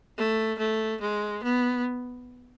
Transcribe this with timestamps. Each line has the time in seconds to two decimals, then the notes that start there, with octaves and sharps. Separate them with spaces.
0.17 A3
0.59 A3
1.01 G#3
1.44 B3